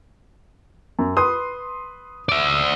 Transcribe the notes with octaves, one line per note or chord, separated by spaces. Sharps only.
F#2
B4 C6 D#6
D5 E5